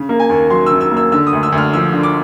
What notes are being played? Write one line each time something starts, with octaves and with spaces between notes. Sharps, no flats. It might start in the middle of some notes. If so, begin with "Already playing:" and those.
Already playing: C#3
A#3
G#5
D#2
F#3 C6
E6
C#3
E6
A#3
E6
D3 E6
D#6
D2
E6
D2
F6
F3 E6
D3
D6